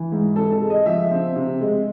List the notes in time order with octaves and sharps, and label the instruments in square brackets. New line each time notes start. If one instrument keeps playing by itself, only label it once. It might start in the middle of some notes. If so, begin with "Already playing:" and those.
Already playing: [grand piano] E3
G#2
C3 A4
A4
G#3
D#5
F3 E5
C4
C3
G#3